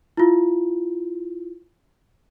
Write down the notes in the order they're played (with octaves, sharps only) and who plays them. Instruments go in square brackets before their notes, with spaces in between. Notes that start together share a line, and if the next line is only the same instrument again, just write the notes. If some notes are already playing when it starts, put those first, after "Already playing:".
[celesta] E4 F4